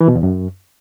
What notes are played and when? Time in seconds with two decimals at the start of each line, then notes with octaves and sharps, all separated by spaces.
0.01 E3
0.08 B2
0.15 E2
0.23 F#2